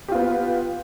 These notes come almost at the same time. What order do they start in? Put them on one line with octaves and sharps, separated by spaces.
G4 F4 B3